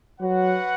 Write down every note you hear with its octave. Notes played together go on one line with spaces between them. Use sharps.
F#3 F#4 B4 F#5